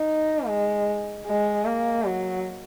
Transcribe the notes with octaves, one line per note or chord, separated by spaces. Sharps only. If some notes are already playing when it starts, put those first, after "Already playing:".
Already playing: D#4
G#3
G#3
A#3
F#3